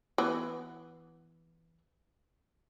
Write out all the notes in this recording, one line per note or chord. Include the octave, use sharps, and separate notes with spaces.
E3 B3